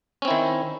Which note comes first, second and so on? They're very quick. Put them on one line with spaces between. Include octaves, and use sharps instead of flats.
C#4 C4 E4 D#3